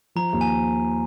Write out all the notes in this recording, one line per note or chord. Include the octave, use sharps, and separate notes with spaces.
F3 A#5
D#2
G#5